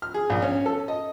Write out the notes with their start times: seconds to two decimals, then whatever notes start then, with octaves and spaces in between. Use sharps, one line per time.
0.02 F6
0.14 G#4
0.30 A#1
0.42 C#4
0.66 A4
0.88 D#5